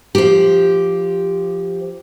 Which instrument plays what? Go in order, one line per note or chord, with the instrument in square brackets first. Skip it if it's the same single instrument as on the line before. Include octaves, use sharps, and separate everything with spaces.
[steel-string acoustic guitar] F3 G4